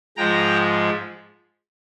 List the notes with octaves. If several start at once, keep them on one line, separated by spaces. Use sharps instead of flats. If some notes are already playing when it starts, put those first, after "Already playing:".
G#2 F3 G#3 G5 A#5